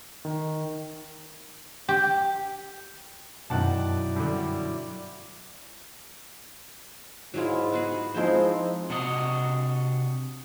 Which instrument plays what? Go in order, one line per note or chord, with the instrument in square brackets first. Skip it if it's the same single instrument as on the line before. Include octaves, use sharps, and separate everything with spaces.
[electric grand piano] D#3
[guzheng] G4
[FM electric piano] F#2 B2 [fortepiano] D#3 F#5 A5 [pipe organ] F#3 E4 D5
[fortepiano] G2 D3
[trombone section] G#2 G#3 [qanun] F#3 E4 F4
[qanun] B3 F#4 G#4
[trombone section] F3 G#3 D#4 [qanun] C4 E4 C5
[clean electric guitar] C3 D4 F#4 D#5